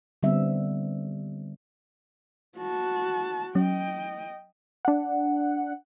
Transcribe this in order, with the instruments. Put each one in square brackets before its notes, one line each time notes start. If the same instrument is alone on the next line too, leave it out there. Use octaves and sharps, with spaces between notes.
[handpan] D3 G3 B3 C4 E5
[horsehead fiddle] F#4 A5
[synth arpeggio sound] F#3 C#4 [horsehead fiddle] D#5 G5
[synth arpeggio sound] D4 F#5